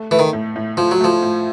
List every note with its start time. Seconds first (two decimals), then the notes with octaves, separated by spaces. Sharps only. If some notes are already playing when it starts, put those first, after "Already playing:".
Already playing: A3
0.11 E3 A3
0.19 D#3
0.33 A2
0.56 A2
0.77 A2 F3
0.91 F#3
1.00 F3 A3
1.22 A2